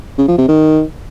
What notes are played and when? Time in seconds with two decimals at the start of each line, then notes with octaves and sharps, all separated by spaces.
0.18 C#3
0.28 F3
0.38 C3
0.48 D#3